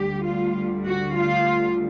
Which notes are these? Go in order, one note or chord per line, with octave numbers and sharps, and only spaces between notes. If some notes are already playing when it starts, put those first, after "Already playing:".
Already playing: D2 D3 G3 G4
F4
F#4
F4